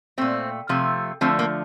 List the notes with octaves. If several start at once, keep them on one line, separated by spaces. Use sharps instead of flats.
A#2 A3 C4
C3 F3 A3
D3 F3 A3 C4
A#3